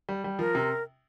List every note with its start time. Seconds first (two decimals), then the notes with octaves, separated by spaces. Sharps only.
0.09 G3
0.24 G3
0.39 F3 A#4
0.55 C3